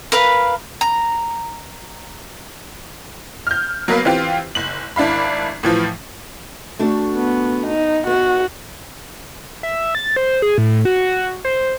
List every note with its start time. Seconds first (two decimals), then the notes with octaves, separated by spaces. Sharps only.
0.12 A#4 B4 F5
0.81 A#5
3.47 F6 G6
3.88 F#3 A#3 B3 A#4 B4 F5
4.05 E3 C4 F4 G4
4.55 F#1 F#7
4.96 G#1 D4 E4 F5 B5
5.63 A2 E3 F3 F4
6.79 A3 D4 F#4
7.14 B3
7.67 D#4
8.07 B3 F#4 F#5
9.63 E5
9.95 A6
10.16 C5
10.42 G#4
10.58 A2
10.85 F#4
11.45 C5